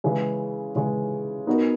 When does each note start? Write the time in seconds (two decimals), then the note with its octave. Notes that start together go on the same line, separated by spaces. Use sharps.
0.04 C#3 E3 G#3
0.75 C#3 E3 G#3
1.47 B3 D#4 F#4 A#4